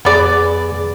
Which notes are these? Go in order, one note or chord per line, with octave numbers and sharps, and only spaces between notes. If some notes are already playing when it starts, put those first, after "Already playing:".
F2 B3 G#4 D5